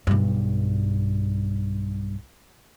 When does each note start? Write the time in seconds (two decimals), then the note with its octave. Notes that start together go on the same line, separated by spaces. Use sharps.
0.07 B1 G2